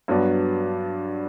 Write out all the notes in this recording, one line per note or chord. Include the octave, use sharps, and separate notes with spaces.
G2 F#3 B3 D4